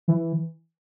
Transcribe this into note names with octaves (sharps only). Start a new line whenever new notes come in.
E3